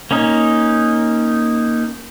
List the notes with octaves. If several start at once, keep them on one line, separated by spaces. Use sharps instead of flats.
A#3 C#4 D#4